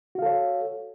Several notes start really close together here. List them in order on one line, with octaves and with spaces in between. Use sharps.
F#4 F5 A4 C#5